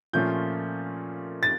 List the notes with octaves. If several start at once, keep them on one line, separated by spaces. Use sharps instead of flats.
A#2 F3 A3 C#4 F4 G6
A6